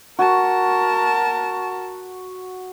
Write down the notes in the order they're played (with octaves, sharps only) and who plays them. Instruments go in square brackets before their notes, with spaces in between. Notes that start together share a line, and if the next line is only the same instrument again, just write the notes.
[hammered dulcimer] F#4 [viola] A#4 A5